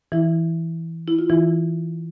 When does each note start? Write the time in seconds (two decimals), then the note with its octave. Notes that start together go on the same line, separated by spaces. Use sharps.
0.12 E3 E4
1.08 E4
1.19 F4
1.30 E3 E4